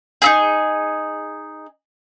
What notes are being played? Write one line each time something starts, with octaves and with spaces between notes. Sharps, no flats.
D#4 E4 G#4